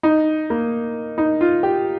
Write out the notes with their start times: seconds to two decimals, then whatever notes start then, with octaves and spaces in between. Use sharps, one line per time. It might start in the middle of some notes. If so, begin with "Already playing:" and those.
0.03 D#4
0.50 A#3
1.18 D#4
1.41 F4
1.63 G4